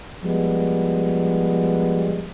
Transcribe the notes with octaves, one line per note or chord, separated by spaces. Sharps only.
F3 G3 G#3 B3